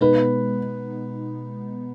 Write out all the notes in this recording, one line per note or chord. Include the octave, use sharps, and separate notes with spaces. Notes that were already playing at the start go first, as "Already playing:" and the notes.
B2 G#3 B3 D#4 B4